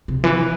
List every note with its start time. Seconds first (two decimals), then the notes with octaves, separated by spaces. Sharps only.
0.08 C3
0.24 E3